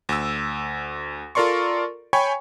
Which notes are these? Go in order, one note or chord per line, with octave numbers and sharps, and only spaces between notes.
D2 E6
F4 A4 A#4 D5 C6 C#6
C#5 G5 G#5 B5 C#6